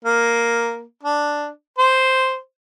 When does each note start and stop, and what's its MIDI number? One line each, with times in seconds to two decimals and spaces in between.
0.05 0.82 58
1.03 1.48 62
1.78 2.37 72